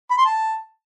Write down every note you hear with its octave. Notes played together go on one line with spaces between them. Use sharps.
B5
C6
A5